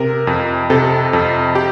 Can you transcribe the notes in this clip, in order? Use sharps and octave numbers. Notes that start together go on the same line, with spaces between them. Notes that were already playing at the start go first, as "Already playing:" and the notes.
Already playing: C3 A#4
F2
C3 A4
F2
G4